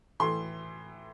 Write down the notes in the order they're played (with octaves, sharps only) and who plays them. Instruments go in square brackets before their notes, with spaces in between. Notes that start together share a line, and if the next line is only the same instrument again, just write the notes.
[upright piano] A2 E3 C6